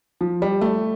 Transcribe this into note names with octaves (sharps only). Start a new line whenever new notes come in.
F3
G3
A3